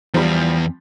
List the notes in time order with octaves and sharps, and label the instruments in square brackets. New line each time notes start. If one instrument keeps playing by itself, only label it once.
[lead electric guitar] E2 [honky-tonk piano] F3 G3